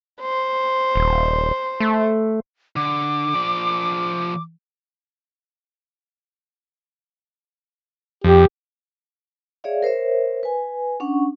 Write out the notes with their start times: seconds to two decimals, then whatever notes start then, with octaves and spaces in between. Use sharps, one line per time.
0.21 C5
0.96 D#1
1.80 A3
2.76 D3 D6
3.34 F3 D5
8.24 F2 G4
9.64 G#4 C#5 D5 E5 F5
9.83 A#4 C5 C#5 E5
10.43 B4 G#5
11.00 C#4 D4 F#5 C#6